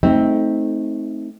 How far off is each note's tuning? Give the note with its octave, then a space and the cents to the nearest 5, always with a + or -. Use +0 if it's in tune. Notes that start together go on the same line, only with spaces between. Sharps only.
A3 -10 C4 +0 D#4 +20